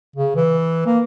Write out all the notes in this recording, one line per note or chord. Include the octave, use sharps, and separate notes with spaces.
C#3
E3
A#3